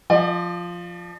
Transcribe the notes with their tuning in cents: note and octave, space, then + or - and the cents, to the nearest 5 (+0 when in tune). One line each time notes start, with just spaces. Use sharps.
F3 +0 D5 +35